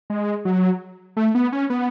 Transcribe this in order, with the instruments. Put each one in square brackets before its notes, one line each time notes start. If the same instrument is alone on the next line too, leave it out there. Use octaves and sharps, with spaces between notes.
[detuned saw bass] G#3
F#3
A3
B3
C#4
B3